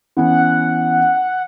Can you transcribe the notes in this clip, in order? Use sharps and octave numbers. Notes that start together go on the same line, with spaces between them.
E3 B3 C#4 F#5